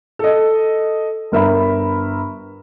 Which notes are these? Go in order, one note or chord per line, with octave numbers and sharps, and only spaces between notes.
A4 D#5
G1 A#4 E5 B5